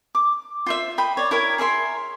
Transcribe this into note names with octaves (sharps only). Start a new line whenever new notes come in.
D6
F4 C5 E5
D#5 G5 B5
C#5 D5
E4 A#4 C#5
G#4 A#4 E5 C6